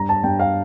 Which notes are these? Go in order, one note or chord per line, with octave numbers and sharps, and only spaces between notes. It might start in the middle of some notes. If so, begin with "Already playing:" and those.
Already playing: G2 A#5
A5
G2 G5
F5